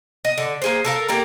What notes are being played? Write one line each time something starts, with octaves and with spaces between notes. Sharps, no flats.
D#5
D3
A#3 G#4 C5
A4 A#4 F5
A#3 G4 A4 A#5